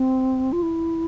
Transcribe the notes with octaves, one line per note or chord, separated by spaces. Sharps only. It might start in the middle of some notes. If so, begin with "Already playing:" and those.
Already playing: C4
F4
E4